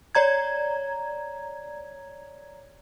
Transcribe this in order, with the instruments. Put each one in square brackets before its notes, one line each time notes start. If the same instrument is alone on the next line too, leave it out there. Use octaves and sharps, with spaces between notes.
[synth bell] C#5 D5 A#5 G#6